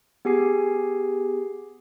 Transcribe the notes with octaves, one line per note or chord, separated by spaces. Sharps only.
B3 G4 G#4 G#5 C7